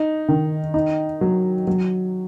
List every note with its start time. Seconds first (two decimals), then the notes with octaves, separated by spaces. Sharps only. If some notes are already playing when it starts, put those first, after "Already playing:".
Already playing: D#4
0.28 D#3
0.74 D#4
1.21 F#3
1.67 F#3